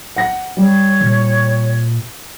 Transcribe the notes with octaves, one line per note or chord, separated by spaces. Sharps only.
F#5 A#6
G3 C#5
A#2